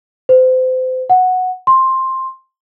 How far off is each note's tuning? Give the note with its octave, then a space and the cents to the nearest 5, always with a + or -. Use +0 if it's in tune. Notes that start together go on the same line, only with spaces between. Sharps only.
C5 -30
F#5 -5
C6 +10